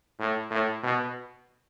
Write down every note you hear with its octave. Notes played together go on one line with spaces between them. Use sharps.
A2
A2
B2